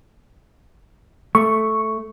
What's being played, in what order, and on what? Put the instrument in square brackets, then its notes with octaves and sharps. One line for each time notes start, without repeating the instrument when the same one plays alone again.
[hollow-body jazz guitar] A3 [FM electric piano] C#6